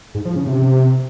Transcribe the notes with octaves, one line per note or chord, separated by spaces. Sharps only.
G#2
F3
C#3
C3